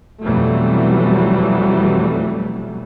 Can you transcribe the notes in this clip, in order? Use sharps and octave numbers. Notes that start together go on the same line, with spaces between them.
F2 B2 E3 F#3 G3 A3